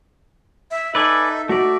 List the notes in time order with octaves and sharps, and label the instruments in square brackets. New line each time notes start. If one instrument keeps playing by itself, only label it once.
[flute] E5
[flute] D#4 [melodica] A4 E5 [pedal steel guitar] B4 D5 G#5
[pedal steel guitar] A3 D5 [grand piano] F#4 [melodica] E5